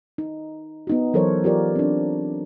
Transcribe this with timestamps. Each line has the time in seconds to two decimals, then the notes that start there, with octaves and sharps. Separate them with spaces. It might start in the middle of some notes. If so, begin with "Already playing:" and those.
0.18 D#4
0.87 B3 D#4 F#4
1.14 E3 F#3 A4 A#4 C5 C#5
1.44 F4 G4 A#4 D5
1.76 C4 D4